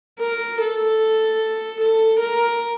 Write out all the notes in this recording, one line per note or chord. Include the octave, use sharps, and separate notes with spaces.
A#4
A4
A4
A#4